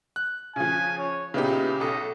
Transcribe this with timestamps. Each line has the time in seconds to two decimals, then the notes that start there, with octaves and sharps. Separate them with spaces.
0.16 F#6
0.56 C#3 F3 G#5
0.98 C#5
1.34 A#2 C#3 B3 D#4 E4 G4
1.80 B1 A4 D#5